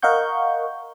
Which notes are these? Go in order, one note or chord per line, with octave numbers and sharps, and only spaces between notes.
A#4 D#5 F5 F#5 C#6 G6